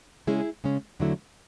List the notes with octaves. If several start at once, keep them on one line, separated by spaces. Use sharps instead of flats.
C#3 G#3 C#4 E4 G#4
C#3 G#3 C#4
E2 D3 F#3 A3 E4